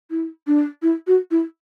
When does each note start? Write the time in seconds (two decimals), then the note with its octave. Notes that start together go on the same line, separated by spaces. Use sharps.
0.11 E4
0.47 D4
0.82 E4
1.07 F#4
1.31 E4